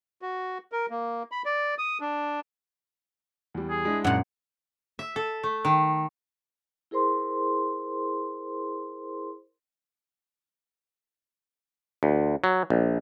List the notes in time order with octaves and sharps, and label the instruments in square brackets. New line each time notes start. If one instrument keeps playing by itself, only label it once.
[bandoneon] F#4
A#4
A#3
B5
D5
D#6
D4
[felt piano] E2 G3
[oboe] G#4
[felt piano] G#3 D4 E4
[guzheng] F#2 A#2 [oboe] F#5
[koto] E5
A4
A3
D#3
[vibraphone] E4 G#4 A#4 C5 C6
[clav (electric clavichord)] D2
F#3
A#1